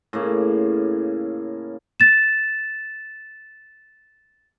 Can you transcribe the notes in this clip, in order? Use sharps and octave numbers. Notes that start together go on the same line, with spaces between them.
A2 C#3 A#3
A6 E7